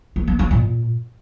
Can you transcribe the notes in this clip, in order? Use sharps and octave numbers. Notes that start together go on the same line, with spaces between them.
A3
B3
D#4
A#2